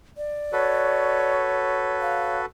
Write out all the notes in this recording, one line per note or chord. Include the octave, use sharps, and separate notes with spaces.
D5
F#4 A4 B4 C#5
F5